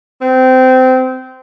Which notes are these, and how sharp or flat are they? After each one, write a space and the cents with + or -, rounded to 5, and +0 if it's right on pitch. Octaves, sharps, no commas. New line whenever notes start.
C4 -20